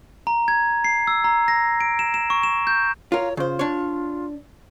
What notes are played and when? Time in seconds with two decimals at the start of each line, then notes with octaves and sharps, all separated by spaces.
0.27 A#5
0.48 G#6
0.84 C7
1.07 E6
1.24 A#5
1.48 A#6
1.81 D7
1.99 E7
2.14 E7
2.30 C#6
2.43 E7
2.67 G6
3.12 F4 A#4 C#5
3.37 C#3 F4 C5
3.59 D4 C#5